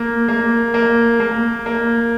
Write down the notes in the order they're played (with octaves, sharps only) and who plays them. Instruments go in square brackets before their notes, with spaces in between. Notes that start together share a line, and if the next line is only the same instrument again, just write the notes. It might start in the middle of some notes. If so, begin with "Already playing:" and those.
Already playing: [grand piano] A#3
A#3
A#3
A#3
A#3